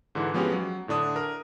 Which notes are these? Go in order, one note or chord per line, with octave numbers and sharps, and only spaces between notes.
G#2 D3 E3
F3 G#3 B3 C#4 F#4 G4
F#3
A2 D3 D4 D#6
A#4